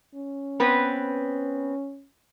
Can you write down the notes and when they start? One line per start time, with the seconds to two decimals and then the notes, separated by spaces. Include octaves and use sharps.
0.15 C#4
0.60 B3 C4 B4